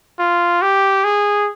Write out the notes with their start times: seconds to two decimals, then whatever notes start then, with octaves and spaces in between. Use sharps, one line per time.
0.19 F4
0.62 G4
1.04 G#4